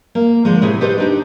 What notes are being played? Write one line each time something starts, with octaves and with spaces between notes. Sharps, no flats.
A#3
D3 F3 G#3
A2 C3 E4 G#4
G4 A4 B4 C5 D#5
D4 D#4 G4